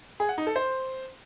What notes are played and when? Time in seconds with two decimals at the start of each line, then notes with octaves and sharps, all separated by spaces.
0.20 G#4
0.29 F#5
0.38 D#4
0.47 A4
0.56 C5